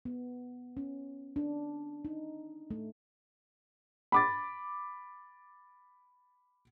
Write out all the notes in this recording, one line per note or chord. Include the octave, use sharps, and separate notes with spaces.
B3
C#4
D4
D#4
A3
B5 D6 A6